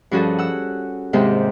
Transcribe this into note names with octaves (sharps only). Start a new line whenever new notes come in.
G2 F3 C#4 F#4 G#4 A4
F#5 E6
D#2 G#2 C3 G#3 G4